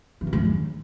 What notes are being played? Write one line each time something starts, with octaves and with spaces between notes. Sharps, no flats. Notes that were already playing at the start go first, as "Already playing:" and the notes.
E3
F#2
G#2
F#2
D#3